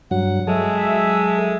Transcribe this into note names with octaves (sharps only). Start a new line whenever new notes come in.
G2 F#3 F#5
F#3 G#3 A4 E5